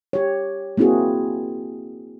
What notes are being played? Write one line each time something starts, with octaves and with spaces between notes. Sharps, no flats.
G4 C#5
A#3 C4 E4 F#4 G#4